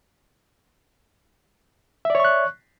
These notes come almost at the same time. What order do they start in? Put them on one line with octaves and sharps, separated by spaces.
E5 D5 C#5 C#6 F#6